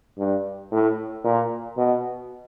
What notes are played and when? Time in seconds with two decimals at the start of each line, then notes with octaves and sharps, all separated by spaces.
0.18 G2
0.71 A2
1.24 A#2
1.77 B2